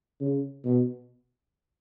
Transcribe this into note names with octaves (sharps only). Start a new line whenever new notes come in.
C#3
B2